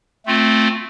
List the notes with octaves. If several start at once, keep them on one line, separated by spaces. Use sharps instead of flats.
A3 C4 F4